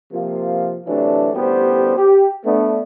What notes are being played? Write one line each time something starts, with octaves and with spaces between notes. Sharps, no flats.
C3 F3 A#3 F4
C3 E3 F#3 A3 D4
A1 D2 G3 B3 G4 C5
G4
A3 B3 D4